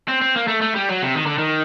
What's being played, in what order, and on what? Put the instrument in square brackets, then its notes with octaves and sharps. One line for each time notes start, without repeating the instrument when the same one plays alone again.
[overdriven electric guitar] C4
C4
A#3
A3
A3
G3
F#3
C3
D#3
D3
D#3